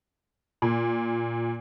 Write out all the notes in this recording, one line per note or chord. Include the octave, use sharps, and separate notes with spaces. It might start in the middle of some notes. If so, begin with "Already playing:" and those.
A#2